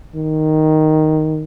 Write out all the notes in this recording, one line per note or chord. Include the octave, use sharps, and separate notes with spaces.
D#3